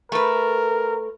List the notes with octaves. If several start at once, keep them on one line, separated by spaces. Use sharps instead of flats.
A3 A#4 B4